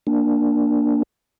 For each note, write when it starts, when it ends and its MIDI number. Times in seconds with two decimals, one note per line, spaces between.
0.07 1.03 58
0.07 1.03 62